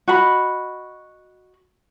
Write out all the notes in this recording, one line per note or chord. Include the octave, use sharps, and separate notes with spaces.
F#4 D#5 B5